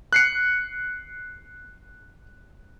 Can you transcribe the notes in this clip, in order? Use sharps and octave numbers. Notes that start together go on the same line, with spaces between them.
F#6 C7 C#7